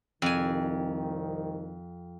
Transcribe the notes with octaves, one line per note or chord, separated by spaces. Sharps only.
C2 F2 D#3 G#5